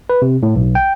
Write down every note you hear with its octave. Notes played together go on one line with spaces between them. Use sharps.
B4
C3
A2
B1
G5